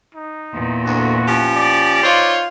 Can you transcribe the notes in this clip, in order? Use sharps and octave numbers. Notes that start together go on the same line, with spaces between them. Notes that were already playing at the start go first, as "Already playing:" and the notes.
D#4
E2 A#2
D2 F#4
F3 C#4 G4
D5
D#4 F4 C5 C#5